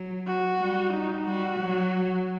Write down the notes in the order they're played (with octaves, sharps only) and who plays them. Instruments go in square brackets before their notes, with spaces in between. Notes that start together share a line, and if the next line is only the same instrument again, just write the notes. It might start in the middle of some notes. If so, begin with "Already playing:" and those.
Already playing: [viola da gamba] F#3
[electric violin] F#4
[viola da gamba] G3
[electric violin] D#4
[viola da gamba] G3 [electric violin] F#4
[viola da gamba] F#3